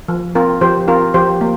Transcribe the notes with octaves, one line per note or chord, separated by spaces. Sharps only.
F3
C4 F4 A#4
F3 G4 C5
C4 F4 A#4
F3 G4 C5
A#3